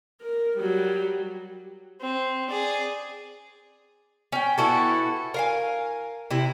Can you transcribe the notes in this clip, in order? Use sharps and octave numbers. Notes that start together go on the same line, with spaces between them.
A#4
F#3 G3
C4
G#4 D5
C#4 G5
B3 E4 F#4 A4
A#4 F5 G#5
C3 E4